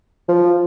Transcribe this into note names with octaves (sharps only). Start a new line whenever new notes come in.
F3